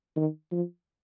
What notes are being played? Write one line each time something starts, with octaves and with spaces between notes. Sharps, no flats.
D#3
F3